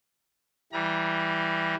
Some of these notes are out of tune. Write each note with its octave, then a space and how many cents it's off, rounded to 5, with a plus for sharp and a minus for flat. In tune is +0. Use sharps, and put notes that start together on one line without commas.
E3 +0 G3 +0 A#5 +35